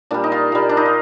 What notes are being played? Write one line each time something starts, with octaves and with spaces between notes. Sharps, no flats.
A#2 G3 D4
D#4
F4
A#2 G3
D4
D#4
F4